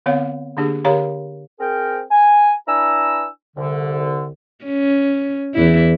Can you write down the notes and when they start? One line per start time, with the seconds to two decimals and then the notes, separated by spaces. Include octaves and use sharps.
0.06 D3 B3 C4 C#5 F5
0.57 D3 A#3 D4 G4 G#4
0.85 D3 G4 A#4 C#5 F5 A#5
1.59 C4 G#4 A#4 G5
2.11 G#5
2.68 D4 E4 B4 G#5 A#5 E6
3.57 C2 D3
4.65 C#4
5.55 E2 E4